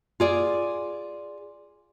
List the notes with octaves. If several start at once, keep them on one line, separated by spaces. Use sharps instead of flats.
F4 G#4 D5